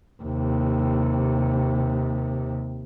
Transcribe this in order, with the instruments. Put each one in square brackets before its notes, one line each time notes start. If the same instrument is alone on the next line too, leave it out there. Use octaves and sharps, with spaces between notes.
[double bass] D#2 C3